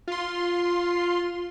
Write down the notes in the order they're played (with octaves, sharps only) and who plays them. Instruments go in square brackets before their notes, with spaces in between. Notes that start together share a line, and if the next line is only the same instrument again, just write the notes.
[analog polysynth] F4 C6